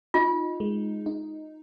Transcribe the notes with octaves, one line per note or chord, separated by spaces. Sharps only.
D#4 F4
G#3
D#4